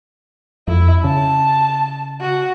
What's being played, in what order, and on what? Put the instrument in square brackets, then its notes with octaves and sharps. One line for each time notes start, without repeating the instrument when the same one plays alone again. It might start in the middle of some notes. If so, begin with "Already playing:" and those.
[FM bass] F2 [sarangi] E4
[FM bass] C#3 [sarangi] A5
[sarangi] F#4